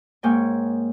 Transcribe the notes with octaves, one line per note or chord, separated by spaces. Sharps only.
G#2 A#3 C#5 G5 G#5